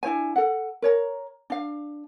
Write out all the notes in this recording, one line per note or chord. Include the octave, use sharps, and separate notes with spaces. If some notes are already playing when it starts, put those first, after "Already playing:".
D4 E4 C5 G#5
A4 F#5
A#4 C#5 A#5
D4 F5